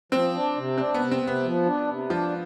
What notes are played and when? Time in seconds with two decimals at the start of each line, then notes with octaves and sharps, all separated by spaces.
0.12 F3 C4
0.34 D4
0.56 C3
0.78 C4 D4
0.94 B3
1.00 C3
1.11 C4
1.22 C3 B3
1.43 F3
1.65 D4
1.88 C3
2.09 F3 D4